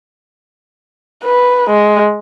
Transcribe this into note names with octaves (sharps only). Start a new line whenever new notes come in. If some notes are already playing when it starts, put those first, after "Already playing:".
B4
G#3